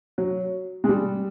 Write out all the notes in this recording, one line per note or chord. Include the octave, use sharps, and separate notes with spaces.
F#3
G#3
G3